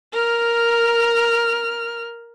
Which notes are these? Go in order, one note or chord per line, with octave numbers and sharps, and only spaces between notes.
A#4 F6